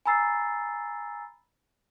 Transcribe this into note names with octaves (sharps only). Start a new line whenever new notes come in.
G#5 A#5 B5 E6 A6 C7